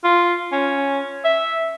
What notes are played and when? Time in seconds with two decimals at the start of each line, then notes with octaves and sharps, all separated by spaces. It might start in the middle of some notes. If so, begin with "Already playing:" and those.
0.04 F4
0.52 C#4
1.25 E5